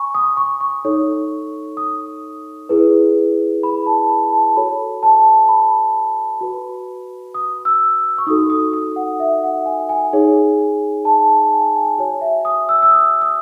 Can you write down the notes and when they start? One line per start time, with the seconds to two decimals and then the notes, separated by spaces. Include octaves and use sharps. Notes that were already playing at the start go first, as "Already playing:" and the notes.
Already playing: G#5 B5 C#6
0.15 D#6
0.37 C#6
0.61 C#6
0.85 D#4 A4 C#5
1.77 D#6
2.69 E4 G#4 B4
3.63 B5
3.86 A5
4.10 B5
4.33 A5
4.56 F#4 A4 C#5 B5
5.03 A5
5.49 B5
6.41 F#4 B4
7.35 D#6
7.65 E6
8.18 C#6
8.27 D#4 F#4 A4 D#6
8.50 D#6
8.73 D#6
8.96 F#5
9.20 E5
9.44 F#5
9.66 G#5
9.89 G#5
10.13 D#4 G#4 C#5
11.05 A5
11.29 A5
11.53 G#5
11.76 G#5
11.98 F#4 C#5 G#5
12.21 E5
12.45 D#6
12.69 E6
12.83 E6
12.91 D#6
13.22 D#6